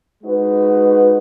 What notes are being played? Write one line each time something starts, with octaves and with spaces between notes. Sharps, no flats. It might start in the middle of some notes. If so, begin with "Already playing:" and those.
G#3 D#4 F#4 B4